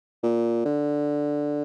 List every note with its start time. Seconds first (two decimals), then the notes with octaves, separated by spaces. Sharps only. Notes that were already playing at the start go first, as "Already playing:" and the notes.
0.23 A#2
0.65 D3